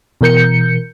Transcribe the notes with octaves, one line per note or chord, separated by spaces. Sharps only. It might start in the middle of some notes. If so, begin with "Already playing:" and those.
B2 E3 A#4 G6 C#7